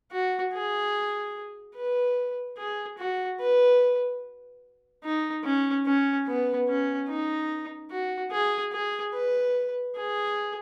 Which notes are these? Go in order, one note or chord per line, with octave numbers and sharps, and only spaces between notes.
F#4
G#4
B4
G#4
F#4
B4
D#4
C#4
C#4
B3
C#4
D#4
F#4
G#4
G#4
B4
G#4